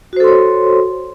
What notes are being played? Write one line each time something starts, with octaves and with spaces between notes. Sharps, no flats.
F#4 A4 C5 C#5 C6